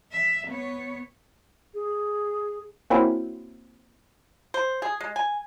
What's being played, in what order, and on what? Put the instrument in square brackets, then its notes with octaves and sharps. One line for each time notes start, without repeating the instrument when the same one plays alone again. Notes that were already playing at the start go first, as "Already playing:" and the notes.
[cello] E5
B3 C#5
[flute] G#4
[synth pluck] A#3 C4 C#4 E4 F#4
[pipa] C5
G#4
G#3
G#5